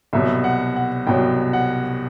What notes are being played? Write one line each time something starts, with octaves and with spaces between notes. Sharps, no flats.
C2 B2 F#3 E5
F#5
F#5
C2 B2 F#3 G5
F#5